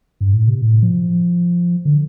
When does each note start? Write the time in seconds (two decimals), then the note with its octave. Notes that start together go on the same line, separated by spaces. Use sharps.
0.21 G2
0.33 A2
0.48 C3
0.61 A2
0.83 F3
1.85 D3